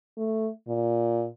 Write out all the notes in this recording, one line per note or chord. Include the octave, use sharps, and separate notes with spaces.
A3
A#2